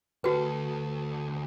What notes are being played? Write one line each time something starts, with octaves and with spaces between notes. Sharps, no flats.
D2 F#4 A4 B4